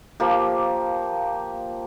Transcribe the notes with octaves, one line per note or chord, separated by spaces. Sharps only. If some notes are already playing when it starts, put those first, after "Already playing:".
F3 A#3 G4